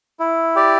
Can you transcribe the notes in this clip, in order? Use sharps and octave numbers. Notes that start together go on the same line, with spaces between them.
E4
G4 D5